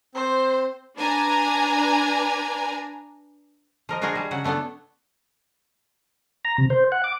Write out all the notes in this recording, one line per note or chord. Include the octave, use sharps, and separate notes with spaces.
C4 C5
D4 B4 G#5 A#5
F3 A#4 D#5
D4 F4 F#4 G#4 A#4 D#5
G3 G#4
C#3 F#3 F#5
A3 B3 D4 E4 A4
A#5
C3
C5
F#5
D6